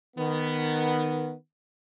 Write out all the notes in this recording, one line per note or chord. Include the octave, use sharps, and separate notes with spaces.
D#3 B3